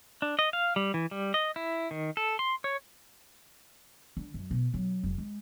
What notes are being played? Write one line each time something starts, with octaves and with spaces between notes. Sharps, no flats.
D4
D#5
F5
G3
E3
G3
D#5
E4
D#3
A4
C6
C#5
D3
F#2
B2
F#3
F1
G#3